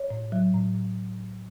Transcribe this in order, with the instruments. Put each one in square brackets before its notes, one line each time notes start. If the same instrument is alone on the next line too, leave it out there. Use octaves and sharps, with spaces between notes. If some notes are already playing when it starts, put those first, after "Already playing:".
Already playing: [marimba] C#5
A2
F#3
A2